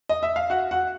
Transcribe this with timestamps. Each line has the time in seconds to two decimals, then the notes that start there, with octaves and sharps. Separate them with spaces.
0.09 D#5
0.23 E5
0.36 F5
0.50 F#4 F#5
0.71 F#4 F#5